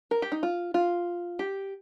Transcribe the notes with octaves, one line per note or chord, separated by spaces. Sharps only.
A#4
G4
D#4
F4
F4
G4